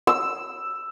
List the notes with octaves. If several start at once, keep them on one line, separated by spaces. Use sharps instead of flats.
E6